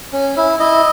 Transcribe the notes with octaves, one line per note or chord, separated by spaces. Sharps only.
C#4
E4
E4 D#5